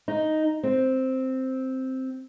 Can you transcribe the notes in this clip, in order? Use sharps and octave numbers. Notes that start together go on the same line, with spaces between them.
D#4
C4